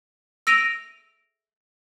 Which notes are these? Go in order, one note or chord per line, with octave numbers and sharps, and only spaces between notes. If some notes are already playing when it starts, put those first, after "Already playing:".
E6 A#6 D7 D#7 F7